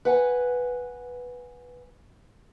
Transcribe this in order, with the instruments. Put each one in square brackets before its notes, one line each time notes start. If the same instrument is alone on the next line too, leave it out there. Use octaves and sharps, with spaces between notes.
[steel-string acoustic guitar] B4 F#5 G#5